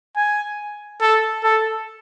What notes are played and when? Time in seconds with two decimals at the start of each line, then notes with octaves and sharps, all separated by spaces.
0.16 G#5
1.01 A4
1.44 A4